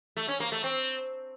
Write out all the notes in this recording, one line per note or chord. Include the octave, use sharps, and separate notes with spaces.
A3
C#4
A#3
A3
C4